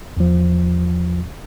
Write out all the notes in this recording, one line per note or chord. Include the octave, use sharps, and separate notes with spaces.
E2 F3